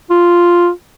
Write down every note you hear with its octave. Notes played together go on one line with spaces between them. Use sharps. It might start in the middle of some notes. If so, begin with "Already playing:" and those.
F4